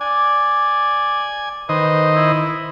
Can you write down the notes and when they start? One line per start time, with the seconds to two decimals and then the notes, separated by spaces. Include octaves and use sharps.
0.01 D5 G#5
1.69 D#3 B4 C5 D#5
2.15 E4